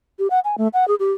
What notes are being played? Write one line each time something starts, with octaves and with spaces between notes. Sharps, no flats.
G4
F#5
G#5
A3
F#5
G#4
G4